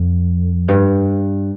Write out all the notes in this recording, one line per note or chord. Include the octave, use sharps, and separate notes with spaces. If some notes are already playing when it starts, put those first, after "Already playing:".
Already playing: F2
G2